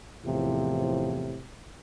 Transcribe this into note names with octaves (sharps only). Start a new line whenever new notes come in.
E2 A2 C3 F3